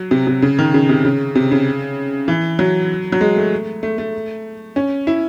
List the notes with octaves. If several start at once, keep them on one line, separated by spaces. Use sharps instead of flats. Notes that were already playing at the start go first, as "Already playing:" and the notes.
Already playing: F#3
C3
C3
C#3
D#3
C#3
C3
C#3
C3
C#3
E3
F#3
F#3
G#3
A3
A3
A3
C#4
E4